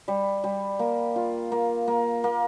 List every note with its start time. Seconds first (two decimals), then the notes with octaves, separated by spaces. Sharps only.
0.08 G3
0.44 G3
0.79 A#3
1.16 F4
1.52 A#3
1.87 A#3
2.24 A#3